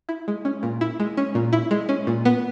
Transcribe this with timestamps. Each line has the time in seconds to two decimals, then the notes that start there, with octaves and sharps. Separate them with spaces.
0.09 E4
0.28 G#3
0.45 C#4
0.63 A#2
0.81 E4
1.00 G#3
1.17 C#4
1.35 A#2
1.53 E4
1.71 G#3
1.89 C#4
2.07 A#2
2.25 B3